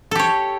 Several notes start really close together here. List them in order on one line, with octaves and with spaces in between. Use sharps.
A4 G4 C#5